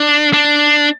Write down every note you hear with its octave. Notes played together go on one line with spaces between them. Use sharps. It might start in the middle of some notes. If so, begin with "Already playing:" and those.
Already playing: D4
D4